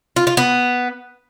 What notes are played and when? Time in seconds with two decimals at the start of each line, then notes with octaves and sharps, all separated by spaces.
0.16 F4
0.27 F4
0.37 B3